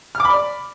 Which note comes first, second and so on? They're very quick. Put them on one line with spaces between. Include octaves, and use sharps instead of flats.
F6 D6 B5 D5